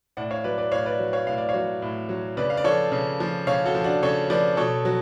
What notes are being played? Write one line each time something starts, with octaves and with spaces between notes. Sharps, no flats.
A2 D5 F#5
C#5 F5
F#3 B4 D5
B4 D5
A2 C#5 F5
B4 D5
F#3
C#5 F5
A2 F5
D5
C#5 F5
F#3
A2
F#3
C#3 B4 D5
F5
D5
F3 A4 C#5
C#3
F3
C#3 C#5 F5
F#4 A4
F3
D4 F#4
C#3 A4 C#5
F3 B4 D5
B2 A4 C#5
F#3